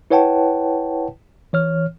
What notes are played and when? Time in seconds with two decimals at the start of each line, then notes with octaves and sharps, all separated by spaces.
0.10 E4 B4 C#5 F#5 G5 A5
1.53 E3 C#5 F6